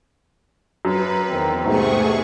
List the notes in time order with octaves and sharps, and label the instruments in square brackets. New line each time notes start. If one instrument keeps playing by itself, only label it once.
[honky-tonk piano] F#2 [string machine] B4
[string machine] E2 [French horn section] D#3 C4
[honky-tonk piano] E2 [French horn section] G#2 C3 [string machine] A3 G#4 C#6